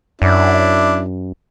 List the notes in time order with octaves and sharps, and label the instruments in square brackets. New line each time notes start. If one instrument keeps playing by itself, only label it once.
[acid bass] F#2 [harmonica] D4 E4